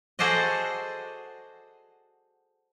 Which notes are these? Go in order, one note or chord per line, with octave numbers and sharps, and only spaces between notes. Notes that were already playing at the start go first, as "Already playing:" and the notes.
F#4 G#4 A4 C5 D5 D#5